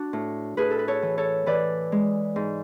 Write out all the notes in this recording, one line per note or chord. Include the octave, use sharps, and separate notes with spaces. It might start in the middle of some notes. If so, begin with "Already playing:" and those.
Already playing: D4 F#4
A2
A2 G#4 B4
A4
B4
A4 C#5
E3
A4 C#5
E3 B4 D5
G#3
G#2